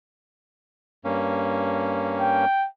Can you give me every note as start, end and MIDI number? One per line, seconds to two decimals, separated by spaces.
1.05 2.45 43
1.05 2.45 58
1.05 2.45 61
2.20 2.67 79